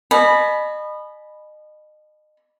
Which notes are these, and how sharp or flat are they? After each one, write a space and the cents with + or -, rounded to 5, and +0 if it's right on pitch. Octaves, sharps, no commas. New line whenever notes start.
D#5 -30 G#5 +40 B5 +0